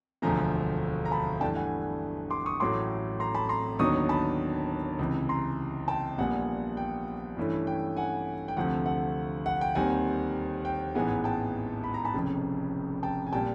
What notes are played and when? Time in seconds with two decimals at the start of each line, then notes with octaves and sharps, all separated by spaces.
0.22 E1 D2 D3 F3 A3 G#5 A#5
1.05 A#5
1.11 A5 B5
1.41 G2 E3 A3 D4 G5 A5
1.56 F#5 G#5
2.30 C6 D6
2.46 C#6 D#6
2.60 A1 A2 F#3 A3 C6 D6
3.20 A#5 C6
3.34 A5 B5
3.49 A#5 C6
3.79 D#2 D3 F#3 B3 D#4 C#6 D#6
4.09 A5 B5
4.99 C#2 C3 E3
5.29 A#5 C6
5.88 G5 A5
6.18 A#1 A#2 G3 B3 F#5 G#5
6.77 G5
7.37 G2 E3 A3 C#4 E4
7.67 G5
7.97 F#5 G#5
8.48 G5
8.57 D2 C3 F3 A3 F#5
8.86 F#5
9.46 F#5
9.61 G5
9.75 D#2 D#3 G3 C4 F#5 G#5
10.65 G5
10.95 A1 G#2 E3 G#3 B3 F#5 G#5
11.24 G5 A5
11.84 B5
11.94 A#5
12.05 A5 B5
12.14 F1 F2 C#3
13.03 G5 A5
13.27 G#5
13.33 A#2 G3 G5 A5